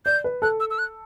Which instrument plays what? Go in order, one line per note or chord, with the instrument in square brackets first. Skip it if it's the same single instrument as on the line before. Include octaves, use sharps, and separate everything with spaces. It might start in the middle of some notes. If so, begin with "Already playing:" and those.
[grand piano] D5 [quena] G6
[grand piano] B4
[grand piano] A4 [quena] F#6
[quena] E6
E6
F#6